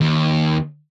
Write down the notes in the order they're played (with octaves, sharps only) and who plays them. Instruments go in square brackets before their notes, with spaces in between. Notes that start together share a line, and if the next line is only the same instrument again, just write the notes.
[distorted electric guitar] D#2